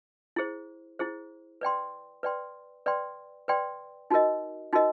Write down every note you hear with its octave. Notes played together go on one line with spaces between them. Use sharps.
E4 G#4 C5
E4 G#4 C5
B4 D5 G5 C6
B4 D5 G5 C6
B4 D5 G5 C6
B4 D5 G5 C6
D#4 F#4 A#4 D#5
D#4 F#4 A#4 D#5